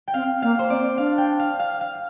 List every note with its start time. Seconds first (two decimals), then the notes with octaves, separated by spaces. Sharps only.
0.08 G5
0.14 C4 F5
0.42 A#3 F5
0.59 C5
0.70 C4 D5
0.98 D4 F5
1.18 G5
1.39 F5
1.59 F5
1.81 F5